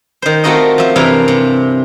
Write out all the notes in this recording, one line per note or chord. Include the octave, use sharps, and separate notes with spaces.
D#3 C5
A3 C4 F4 F#4 A#4 D#5
F3 E5
G2 C3 E3 A#4 F5
C3